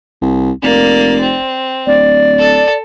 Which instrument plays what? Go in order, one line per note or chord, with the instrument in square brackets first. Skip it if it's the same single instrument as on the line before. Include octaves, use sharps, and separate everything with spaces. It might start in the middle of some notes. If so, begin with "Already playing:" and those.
[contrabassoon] C2
[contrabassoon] F1 [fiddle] A#3 D5
[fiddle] C4
[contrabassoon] D1 [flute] D5
[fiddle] A4